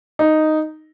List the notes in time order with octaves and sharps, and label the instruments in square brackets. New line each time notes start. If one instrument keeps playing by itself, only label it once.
[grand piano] D#4